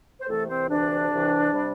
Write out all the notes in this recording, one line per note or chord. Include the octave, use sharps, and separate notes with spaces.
C5
C2 C3 E3 A3 A4
C4 C5
D2 C3 E3 D4
C2 C3 E3
C3 G3